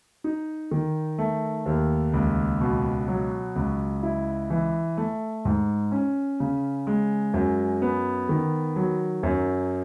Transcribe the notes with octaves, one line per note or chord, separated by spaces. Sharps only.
D#4
D#3
A3
D#2
C#2
B2
F#3
C#2
E4
E3
A3
G#2
C#4
C#3
G#3
F#2
B3
D#3
F#3
F#2